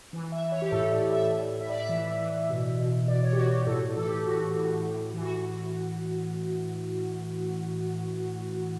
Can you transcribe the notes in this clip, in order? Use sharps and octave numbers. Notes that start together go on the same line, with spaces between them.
E3
E5
E3
C#5
G4
A2 A4
D5
A2
E5
A2
A2 E5
D5
E5
E3
E3
B2
B2
B2 D5
C#5
G4
B2 F#4
G4
A2 A4
E3 A4
G4
A2 F#4
A2
A2
E3
F#4